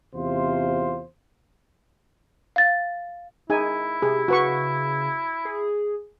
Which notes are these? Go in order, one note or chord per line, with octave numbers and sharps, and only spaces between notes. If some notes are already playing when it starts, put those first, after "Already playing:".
E2 C3 F4 C5
F5 A6
D#4 E4 G#4 G#5
C3 G#4
C#3 F#4 B4 C#6
G#4